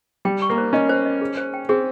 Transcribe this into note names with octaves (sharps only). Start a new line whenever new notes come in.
G3 G5
C#6
A#3
C5
C#4 D#5
C5
D#5
G#4
C5
G5
C4 G#4